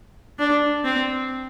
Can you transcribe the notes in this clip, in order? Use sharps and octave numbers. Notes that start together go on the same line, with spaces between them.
D4
C4